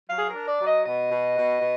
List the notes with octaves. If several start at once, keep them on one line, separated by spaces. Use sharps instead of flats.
F#3 F5
G#4
A#4
D4
D5
F#3
D#5
B2 D#5
B2
B2
B2